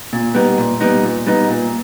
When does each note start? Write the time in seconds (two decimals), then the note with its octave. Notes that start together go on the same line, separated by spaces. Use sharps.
0.13 A#2
0.35 G3 B3 D#4
0.58 A#2
0.80 G3 B3 D#4
1.03 A#2
1.26 G3 B3 D#4
1.48 A#2